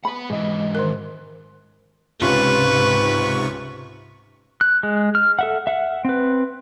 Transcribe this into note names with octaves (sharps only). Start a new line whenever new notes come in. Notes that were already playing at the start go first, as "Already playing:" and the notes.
B4 F#5 B5
G#2 E3 G#3 D#5
D#3 A#4
C#2 G#2 C3 C#4 F4 B4 C#6
F#6
G#3
F6
A4 E5 F#5
E5 F#5
C4 B4